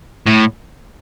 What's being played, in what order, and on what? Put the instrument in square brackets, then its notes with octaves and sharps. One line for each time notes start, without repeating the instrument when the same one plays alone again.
[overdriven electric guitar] A2